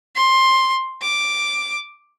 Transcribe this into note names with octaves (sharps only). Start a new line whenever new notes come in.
C6
D6